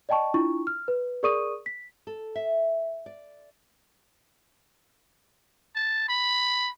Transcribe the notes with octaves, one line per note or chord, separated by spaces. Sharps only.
D5 D#5 G5 A5 C#6
D4 E4 F4 C#6
F6
B4
G#4 A#4 D5 C#6 D#6 D#7
B6
A4
E5
D5
A5
B5